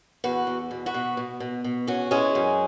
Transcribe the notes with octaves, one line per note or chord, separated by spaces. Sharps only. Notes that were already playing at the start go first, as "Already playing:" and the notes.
E2 F#4 B4
E2
B2
F#4 B4
B2
B2
B2
B2
E2 C#4 F#4
E3 G#3 C#4
F#2